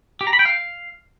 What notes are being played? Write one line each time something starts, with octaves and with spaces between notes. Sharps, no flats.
G4
A#5
B5
G5
F5